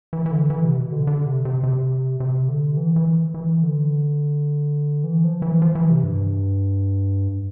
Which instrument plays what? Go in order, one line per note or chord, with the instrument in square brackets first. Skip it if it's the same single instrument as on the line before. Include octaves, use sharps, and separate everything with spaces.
[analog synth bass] E3
E3
D3
E3
C3
B2
D3
D3
C3
C3
C3
C3
D3
E3
E3
E3
D3
E3
F3
E3
F3
E3
C3
G2